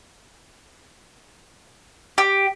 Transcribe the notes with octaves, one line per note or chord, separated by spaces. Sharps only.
G4